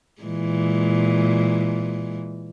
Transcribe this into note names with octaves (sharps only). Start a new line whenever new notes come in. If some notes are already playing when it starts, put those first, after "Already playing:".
A#2 E3 G#3